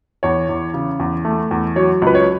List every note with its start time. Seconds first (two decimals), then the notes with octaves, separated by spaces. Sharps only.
0.23 E2 C#5
0.49 E2
0.74 C#3
1.00 E2
1.25 A3
1.51 E2
1.76 F#3 C#5
2.02 C#2 B4
2.15 C#5